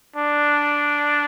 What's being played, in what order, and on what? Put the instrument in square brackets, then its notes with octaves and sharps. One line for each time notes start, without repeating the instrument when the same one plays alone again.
[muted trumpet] D4